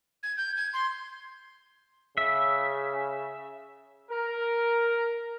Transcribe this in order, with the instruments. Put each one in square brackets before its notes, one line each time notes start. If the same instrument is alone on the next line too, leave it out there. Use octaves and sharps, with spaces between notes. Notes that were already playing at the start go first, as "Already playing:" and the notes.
[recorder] G#6
G6
G#6
C6
[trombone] C#3 [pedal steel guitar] E5
[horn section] A#4